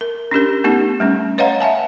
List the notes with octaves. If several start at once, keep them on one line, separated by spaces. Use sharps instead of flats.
A#4
C#4 D4 G4 A#4
A3 B3 D#4 G4
G3 A3 C#4
B4 C#5 D#5 F5 F#5 A#5
E5 F#5 G#5 A5